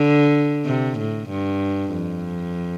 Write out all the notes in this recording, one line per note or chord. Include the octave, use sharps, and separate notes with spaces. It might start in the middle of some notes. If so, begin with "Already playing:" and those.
Already playing: D3
C3
A2
G2
F2